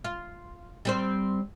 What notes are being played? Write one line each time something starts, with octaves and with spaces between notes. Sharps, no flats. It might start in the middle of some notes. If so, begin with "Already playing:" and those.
F4
G3 C4 C5